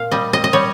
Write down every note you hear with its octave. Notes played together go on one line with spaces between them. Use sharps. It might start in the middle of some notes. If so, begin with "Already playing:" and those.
Already playing: A#2 F5
G3 D#5
D#5
D#5
G3 C#5